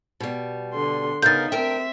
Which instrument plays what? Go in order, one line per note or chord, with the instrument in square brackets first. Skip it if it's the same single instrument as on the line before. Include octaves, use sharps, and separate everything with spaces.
[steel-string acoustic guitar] B2 G3
[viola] D3 C6
[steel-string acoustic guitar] C#3 B3 F5 [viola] D#4 A#4 [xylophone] G6 A6
[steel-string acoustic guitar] D2 A#4 G5 [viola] C4 E5